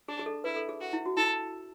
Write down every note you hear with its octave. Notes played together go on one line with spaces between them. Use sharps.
D4 G#4
G#4
A4
E4 B4
A4
G#4
F#4
E4
F#4
E4 A4